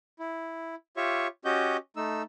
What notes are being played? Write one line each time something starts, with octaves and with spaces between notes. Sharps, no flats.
E4
F4 G4 C#5 E5 C#6
C#4 F#4 G4 D#5 G6
A3 D#4 E6